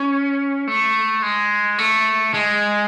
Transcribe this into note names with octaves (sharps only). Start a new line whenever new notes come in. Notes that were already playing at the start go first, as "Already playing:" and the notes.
Already playing: C#4
A3
G#3
A3
G#3